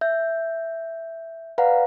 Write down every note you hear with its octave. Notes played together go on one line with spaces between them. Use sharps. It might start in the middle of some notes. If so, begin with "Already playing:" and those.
E5 G6
B4 D5 F5 F#5 A#5